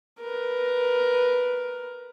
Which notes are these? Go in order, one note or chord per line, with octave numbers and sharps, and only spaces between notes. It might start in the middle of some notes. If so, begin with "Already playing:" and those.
A#4 B4